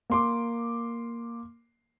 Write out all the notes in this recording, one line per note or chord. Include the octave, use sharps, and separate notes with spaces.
A#3 C6 D6